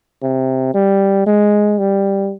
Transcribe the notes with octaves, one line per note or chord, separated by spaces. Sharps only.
C3
G3
G#3
G3